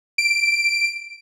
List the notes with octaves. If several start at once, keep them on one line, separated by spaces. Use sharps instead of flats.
D7